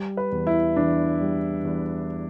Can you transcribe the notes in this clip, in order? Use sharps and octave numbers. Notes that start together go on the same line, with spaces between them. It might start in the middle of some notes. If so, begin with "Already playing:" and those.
Already playing: G3
B4
E2
E4
E2 D4
G3
E2